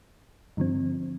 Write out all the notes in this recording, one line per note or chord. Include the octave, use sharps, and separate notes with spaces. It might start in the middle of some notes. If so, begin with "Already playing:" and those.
G2 D3 F3 C4